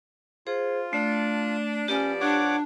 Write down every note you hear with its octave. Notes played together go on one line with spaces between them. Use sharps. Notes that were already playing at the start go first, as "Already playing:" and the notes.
F4 G#4 C5
A3 D4
F3 B3 C#4 G4 D5
D4 C#5 F#5 D6